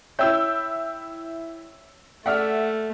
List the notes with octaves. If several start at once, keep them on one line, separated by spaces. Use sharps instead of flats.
E4 C#5 E5 G5 E6 G6
A3 D5 E5 F#5 F6